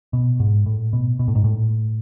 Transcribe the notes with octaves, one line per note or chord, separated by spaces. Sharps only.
B2
G#2
A2
B2
B2
A2
G#2
A2